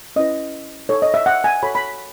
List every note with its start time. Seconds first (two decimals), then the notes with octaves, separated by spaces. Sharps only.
0.16 C#4 E4 B4 D#5
0.89 D#4 A4 C#5
1.02 D#5
1.14 E5
1.26 F#5
1.44 G#5
1.63 F#4 A4 C#5 B5
1.75 B5